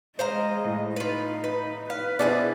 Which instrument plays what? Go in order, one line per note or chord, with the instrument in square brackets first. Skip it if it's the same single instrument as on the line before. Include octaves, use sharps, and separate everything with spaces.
[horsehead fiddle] G#3 D#5 [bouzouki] C5 F5 A#5
[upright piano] A2
[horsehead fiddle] D#4 [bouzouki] F4 B4
[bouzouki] B4
[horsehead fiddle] B4 [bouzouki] F5
[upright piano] B2 D4 E4 [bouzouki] F3 G#4 D5